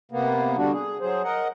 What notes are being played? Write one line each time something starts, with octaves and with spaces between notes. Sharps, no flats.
C3 A#3 B3
D3 G3 D4 F#4
G#4
F#3 G#4 C5
A#4 D#5 F#5